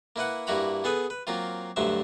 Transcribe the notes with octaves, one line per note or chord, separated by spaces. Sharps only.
A#3 E4 B4 F#5
G2 A#3 E4 F#4 A#5 B5
B3 G#4 A4 B4
B4
F#3 A#3 C4 F4
D2 G2 F#3 C5 E5